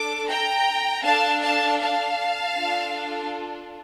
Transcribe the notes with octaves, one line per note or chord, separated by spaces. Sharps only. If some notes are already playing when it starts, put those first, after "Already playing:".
Already playing: D4 A4 D6
G5 A#5
D4 A4 F5 A5
F5 A5
F5 A5
D4 F4 A4